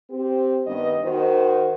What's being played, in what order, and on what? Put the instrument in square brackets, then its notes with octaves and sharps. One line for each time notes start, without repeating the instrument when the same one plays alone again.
[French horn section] C4 G4
G2 D#3 B3 D#5
D#3 F#4 C5